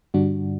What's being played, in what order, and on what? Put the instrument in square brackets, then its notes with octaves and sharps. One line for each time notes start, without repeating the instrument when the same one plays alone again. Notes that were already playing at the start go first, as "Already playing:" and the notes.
[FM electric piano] G2 D3 G3 D4 F#4